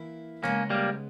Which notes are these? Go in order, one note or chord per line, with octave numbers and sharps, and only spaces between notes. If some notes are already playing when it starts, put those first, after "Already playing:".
Already playing: E3 A#3 E4
C#3 G#3 A#3 B3 C#4
G3 A#3